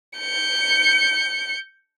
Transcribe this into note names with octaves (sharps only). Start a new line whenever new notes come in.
G6 C#7